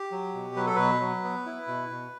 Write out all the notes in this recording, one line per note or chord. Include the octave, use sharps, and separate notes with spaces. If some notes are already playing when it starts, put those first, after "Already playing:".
Already playing: G4
F#3
B2
F#3 B4
A4
B2 B4
F#3
B3
E4
B2
B2